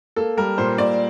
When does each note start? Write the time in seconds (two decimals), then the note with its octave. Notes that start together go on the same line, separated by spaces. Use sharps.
0.16 A#3 A4
0.37 G3 A#4
0.58 A#2 C5
0.78 A#2 D5